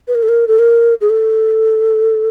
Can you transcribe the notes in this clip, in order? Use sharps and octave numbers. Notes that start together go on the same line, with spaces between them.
B4
A#4
A4
A#4
A4
A#4
G#4
A4